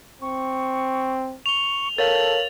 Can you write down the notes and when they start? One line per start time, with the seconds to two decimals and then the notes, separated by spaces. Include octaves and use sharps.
0.22 C4 C#6
1.46 C#6 F7 G7
1.98 A4 A#4 C#5 F5 A6 F#7